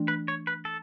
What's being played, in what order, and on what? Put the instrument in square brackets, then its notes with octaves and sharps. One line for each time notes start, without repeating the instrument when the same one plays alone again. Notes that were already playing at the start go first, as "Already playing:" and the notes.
Already playing: [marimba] E3 A3 D4
[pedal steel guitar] B4
C#5
B4
A4